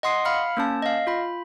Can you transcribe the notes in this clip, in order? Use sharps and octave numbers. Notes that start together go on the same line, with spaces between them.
D#5 F#5 C6 D#6 C7
F5 B5 F6 C#7
A#3 C#4 A5
D#5 F5
F4 B5